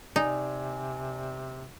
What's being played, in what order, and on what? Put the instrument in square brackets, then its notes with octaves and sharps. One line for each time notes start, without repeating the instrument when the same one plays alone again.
[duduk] C3 [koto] D#4 [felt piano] D5 G#5